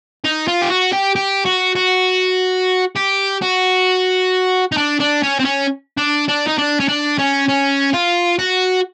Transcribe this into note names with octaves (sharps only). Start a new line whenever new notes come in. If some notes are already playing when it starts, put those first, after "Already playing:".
D#4
F4
G4
F#4
G4
G4
F#4
F#4
G4
F#4
D#4
D4
D4
C#4
C4
C#4
D4
D4
D#4
D4
C#4
D4
C#4
C#4
F4
F#4